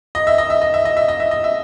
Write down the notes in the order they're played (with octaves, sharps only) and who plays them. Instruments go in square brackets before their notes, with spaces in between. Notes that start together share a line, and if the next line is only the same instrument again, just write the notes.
[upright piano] D#5
E5
D#5
E5
D#5
E5
D#5
E5
D#5
E5
D#5
E5